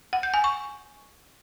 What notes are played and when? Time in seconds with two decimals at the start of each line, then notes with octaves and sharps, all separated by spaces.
0.13 F#5
0.23 G6
0.34 G#5
0.44 C#6